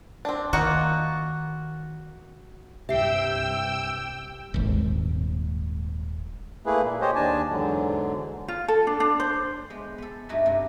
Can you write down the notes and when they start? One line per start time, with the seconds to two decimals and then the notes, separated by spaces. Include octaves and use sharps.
0.25 C4 D4
0.53 D#3 A#3 D#4 F4 F#4
2.89 C2 G2 G4 E5 G5 E6 C7
4.54 D#1 G#1
6.66 A3 A#3 E4 G#4 B4
6.82 A#2
7.01 G4 C5 C#5 D#5
7.15 D#2 D4 G#5 A5
7.49 E2 G#2 D3 F#3
8.48 F4
8.68 A4
8.87 D4
9.00 D4
9.20 C5
9.70 G#3 B3
9.98 B3 A4
10.29 G2 A3 D#4 E4 F#4 E5
10.46 G2 C3